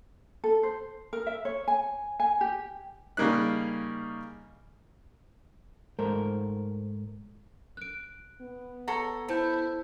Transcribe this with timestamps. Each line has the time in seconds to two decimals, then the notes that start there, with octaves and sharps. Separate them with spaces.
0.44 A4
0.63 C5
1.13 A#4
1.27 E5
1.45 C#5
1.68 G#5
2.20 G#5
2.41 G4
3.17 C#3 G3 A#3 D#4 F#6
5.99 G#2 A3 A#4 C5
7.77 F#6 D7
8.42 B3
8.88 A4 C#5 F#5 A#5
9.28 E4 A4 C5 A5 G6